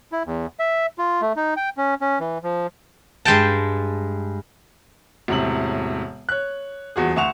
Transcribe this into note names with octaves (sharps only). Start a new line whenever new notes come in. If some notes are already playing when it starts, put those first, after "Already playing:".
E4
E2
E5
F4
A3
D#4
G5
C#4
C#4
E3
F3
G2 G#3 G5 A5
E1 A2 C3 F#7
C#5 F#6
D#1 E2 F#4 G#4
D2 F#5 C#6 E7 F7